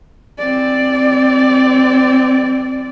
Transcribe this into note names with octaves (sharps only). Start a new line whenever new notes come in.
C4 D5